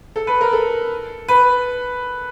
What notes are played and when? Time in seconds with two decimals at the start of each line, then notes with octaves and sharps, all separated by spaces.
0.16 A4
0.27 B4
0.41 A#4
0.53 A4
1.28 B4